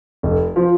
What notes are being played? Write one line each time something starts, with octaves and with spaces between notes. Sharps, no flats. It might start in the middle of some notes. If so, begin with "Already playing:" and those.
F1
F3